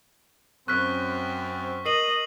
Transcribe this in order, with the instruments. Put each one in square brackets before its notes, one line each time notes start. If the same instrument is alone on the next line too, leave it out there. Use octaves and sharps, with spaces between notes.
[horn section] F#2 C4 [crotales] C#6 F6 B6 [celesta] F#6
[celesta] A#4 [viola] D#5 [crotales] C7 D#7 F#7